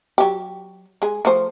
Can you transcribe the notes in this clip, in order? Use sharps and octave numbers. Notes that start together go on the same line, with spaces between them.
F#3 G4
G#3 G#4
F3 A3 C5